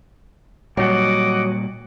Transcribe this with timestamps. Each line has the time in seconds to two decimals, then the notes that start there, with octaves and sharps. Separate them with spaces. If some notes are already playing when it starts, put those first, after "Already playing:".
0.77 A#2 F#3 G3 D#5 F#5 D6